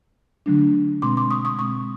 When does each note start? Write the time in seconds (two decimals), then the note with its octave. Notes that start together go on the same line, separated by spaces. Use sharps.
0.46 D3 F#3 A3 D4
1.02 B2 G#3 C4 C6 D6
1.17 C6 D6
1.31 C#6 D#6
1.45 C#6 D#6
1.59 B2 G#3 C4 C#6 D#6